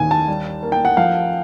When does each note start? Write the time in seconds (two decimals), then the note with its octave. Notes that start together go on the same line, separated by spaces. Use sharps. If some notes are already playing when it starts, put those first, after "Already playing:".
Already playing: D#2 D#3 G#5
0.11 A5
0.28 G3
0.63 A#3
0.72 G5
0.85 F#5
0.97 F3 F5